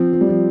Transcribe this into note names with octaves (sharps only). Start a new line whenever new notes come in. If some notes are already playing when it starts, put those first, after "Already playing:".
Already playing: F3 C4
F3
G3
F3